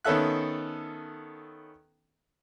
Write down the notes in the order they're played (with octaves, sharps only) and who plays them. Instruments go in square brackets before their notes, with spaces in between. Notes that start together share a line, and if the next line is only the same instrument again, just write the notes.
[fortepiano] D#3 B3 C#4 A4 E5 F#6